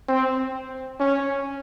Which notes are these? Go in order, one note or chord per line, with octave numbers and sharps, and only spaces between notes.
C4
C#4